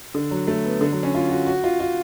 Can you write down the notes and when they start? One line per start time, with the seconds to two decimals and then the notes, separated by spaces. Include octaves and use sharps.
0.14 D3
0.31 F#3
0.47 A3
0.65 B3
0.81 D3
0.92 F#3
1.03 C#4
1.15 F4
1.30 F#4
1.47 F#4
1.64 F4
1.80 F4